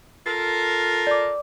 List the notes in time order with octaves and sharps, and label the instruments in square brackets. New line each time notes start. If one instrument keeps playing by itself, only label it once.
[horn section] F4 A4 A#4
[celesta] D5 D6